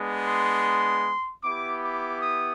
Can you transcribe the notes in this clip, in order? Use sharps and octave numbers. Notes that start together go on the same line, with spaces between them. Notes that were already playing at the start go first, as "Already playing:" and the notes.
Already playing: G#3 B3 D4
C6
B3 E4 G4 D6
D6
D#6